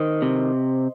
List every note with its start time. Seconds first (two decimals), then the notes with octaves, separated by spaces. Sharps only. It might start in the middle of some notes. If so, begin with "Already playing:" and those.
Already playing: D#3 C5 D#5
0.22 C3